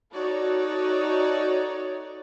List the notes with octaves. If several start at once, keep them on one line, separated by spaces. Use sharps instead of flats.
D#4 F#4 A4 C#5 D5